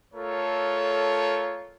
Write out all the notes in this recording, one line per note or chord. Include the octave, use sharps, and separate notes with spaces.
A3 F4 A4 A#4 C#5